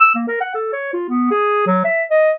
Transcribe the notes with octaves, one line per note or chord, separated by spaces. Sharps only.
E6
A#3
A#4
F#5
A4
C#5
F4
B3
G#4
F#3
E5
D#5